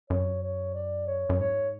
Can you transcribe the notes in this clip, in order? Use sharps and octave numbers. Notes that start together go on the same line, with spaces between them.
F#2 C#5
C#5
D5
C#5
F#2
G#2 C#5